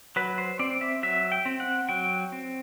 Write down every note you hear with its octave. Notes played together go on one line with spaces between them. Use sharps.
F#3 B4
C5
C4 D5
E5
F#3 E5
G5
C4
F#5
F#3 G5
C4